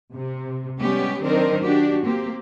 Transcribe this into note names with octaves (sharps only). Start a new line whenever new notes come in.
C3
G3 G#3 B3 C#4 G4
D#3 F#3 C4 D4 A#4 C5
D4 F#4 G4
A#3 C4 G4